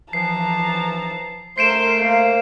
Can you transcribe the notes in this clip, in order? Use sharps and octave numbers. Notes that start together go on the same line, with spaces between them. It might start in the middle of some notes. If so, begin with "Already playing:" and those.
E3 F3 A5 A#5 C7
A3 A#4 C5 C6 C7 D7 E7
A#3